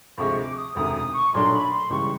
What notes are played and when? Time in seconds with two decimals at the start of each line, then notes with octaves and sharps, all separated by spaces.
0.18 D2 C3 F3 G#3 C#6
0.38 D6
0.56 D#6
0.75 E1 D2 C3 D#3 D#6
0.94 D#6
1.13 C#6
1.33 B1 A#2 F#3 A3 D4 C6
1.52 B5
1.72 C6
1.90 C#2 C#3 E3 G3 C#6